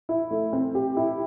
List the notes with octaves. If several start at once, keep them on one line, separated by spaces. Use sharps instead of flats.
E4
A3
C4
G4
E4